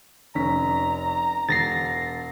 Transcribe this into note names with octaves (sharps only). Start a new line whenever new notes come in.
F1 C#4 A#5 B6
E1 A6 A#6 C7